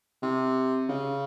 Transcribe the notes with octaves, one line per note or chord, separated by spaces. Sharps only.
C3
C#3